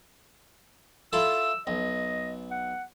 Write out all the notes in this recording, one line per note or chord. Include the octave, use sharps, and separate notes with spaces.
E4 F4 A4 E6
B1 D#5
F#5